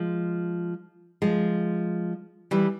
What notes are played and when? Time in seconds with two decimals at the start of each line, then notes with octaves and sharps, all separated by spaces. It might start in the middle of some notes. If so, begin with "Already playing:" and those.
Already playing: F3 G#3
1.22 F3 G#3
2.51 E3 G3